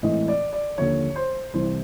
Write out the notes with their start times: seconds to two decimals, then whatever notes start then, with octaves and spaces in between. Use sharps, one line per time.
0.02 A2 E3 G#3 C4 D#5
0.28 D5
0.53 D5
0.77 D#2 D3 F3 C#5
1.16 C5
1.53 C2 C3 E3 G3 C5